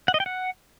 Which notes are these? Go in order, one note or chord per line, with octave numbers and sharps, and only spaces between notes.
F#5
D#5
G5
F#5